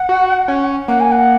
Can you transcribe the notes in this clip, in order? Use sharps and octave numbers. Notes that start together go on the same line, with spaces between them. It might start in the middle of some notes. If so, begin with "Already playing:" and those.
Already playing: F#5
F#4
C#4
A#3 F#5
G#5
F#5